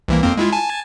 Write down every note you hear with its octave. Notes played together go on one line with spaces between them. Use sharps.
C2 E3 A#3
F2 A#3 C4
G#3 E4 F4
G#5 A5